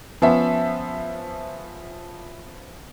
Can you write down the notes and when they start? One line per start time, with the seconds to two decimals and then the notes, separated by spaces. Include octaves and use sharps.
0.22 F3 B3 C#4 E5